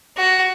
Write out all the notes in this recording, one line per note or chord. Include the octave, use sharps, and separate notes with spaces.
F#4